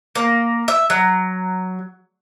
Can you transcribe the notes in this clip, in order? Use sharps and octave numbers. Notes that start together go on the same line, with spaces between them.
A#3
E5
F#3